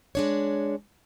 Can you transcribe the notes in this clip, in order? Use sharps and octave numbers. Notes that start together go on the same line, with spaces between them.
G#3 D4 C#5